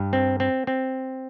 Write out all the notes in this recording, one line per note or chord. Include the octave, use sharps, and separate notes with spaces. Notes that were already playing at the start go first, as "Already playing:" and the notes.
Already playing: G2
C4
C4
C4